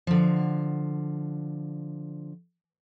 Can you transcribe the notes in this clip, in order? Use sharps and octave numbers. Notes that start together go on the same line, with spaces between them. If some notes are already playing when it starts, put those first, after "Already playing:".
D3 F3